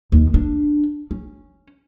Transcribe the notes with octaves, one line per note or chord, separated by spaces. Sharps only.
D#2
D4
C#4